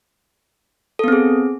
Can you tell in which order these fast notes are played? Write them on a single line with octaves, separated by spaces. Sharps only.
A4 B3 C4 G#4